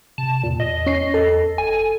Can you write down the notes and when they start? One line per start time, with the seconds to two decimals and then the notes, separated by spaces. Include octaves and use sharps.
0.18 C3 A5
0.43 E2 A#2
0.60 E2 D#5
0.86 C#4 C7
1.14 E2 A4
1.58 F#1 G#5